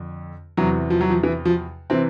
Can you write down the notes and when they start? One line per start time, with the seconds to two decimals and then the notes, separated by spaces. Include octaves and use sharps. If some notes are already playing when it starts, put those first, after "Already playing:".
Already playing: F2 D3
0.57 E2 C3 E3 F#3
0.90 F3
1.01 F#3
1.10 F3
1.23 E3
1.45 F3
1.90 C3 E3 C4